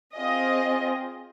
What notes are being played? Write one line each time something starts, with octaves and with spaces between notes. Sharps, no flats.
C4 F4 G#4 D#5